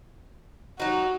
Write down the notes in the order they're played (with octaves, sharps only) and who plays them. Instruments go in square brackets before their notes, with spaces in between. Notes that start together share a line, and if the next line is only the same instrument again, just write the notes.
[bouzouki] F#3 D#4 [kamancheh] F#4